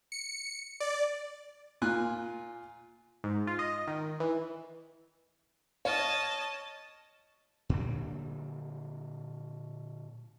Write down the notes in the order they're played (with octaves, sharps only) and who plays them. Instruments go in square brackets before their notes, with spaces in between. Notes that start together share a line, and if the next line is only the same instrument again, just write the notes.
[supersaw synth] C#7
D5
[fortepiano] A#2 F4 G#5 F#6
[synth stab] G#2
F4
D#5
D#3
E3
[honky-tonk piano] C#5 F6 [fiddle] D#5 A5
[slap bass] A#2 D3 F#3 G3